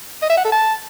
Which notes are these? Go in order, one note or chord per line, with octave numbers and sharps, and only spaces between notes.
D#5
E5
F#5
A4
A5